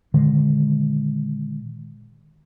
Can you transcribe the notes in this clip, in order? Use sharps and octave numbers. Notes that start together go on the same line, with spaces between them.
A#2 D3 D#3 G#3